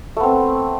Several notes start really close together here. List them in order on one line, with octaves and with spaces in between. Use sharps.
A3 B3 C4